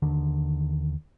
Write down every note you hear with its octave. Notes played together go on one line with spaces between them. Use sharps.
D#2 D3 D#3 D4